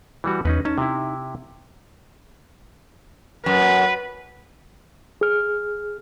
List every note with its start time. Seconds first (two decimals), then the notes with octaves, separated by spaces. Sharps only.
0.24 E3 G3 F#4
0.45 E2 C#4 D#4 B4
0.65 C#4 D#4 A5
0.78 C3 E4
3.46 F#2 B4
5.21 G#4 F6